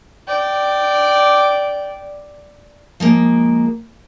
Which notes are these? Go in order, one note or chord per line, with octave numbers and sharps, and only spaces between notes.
D5 G5
F3 G#3 A#3